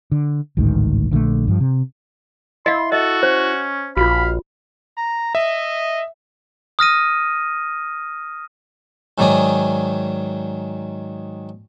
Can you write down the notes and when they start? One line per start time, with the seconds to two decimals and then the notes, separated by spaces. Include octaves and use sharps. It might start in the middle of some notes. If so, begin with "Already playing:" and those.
0.12 D3
0.57 A1 D2 G#2 D#3
1.11 A#1 D3 D#3 A3
1.48 G2 F3
1.60 C3
2.66 E4 D#5 F5 C6
2.92 F#4 A4 D#5
3.23 C#4 C5
3.97 A#1 F4 F#4 F5 B5
4.97 A#5
5.35 D#5 E5
6.79 D#6 F6 A#6 D#7
9.18 G#2 D#3 F#3 D5 G#5 D#6